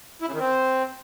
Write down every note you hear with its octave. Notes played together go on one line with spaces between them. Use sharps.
E4
C#3
D#3
C4